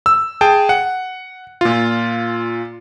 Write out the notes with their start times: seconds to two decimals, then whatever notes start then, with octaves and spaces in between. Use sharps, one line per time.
0.06 E6
0.41 G#4 G5 A5
0.69 F#5
1.61 A#2 F4